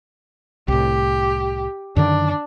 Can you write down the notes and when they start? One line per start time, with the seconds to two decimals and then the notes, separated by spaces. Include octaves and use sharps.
0.68 C2 A2 G4
1.96 F#2 D3 D#3 D4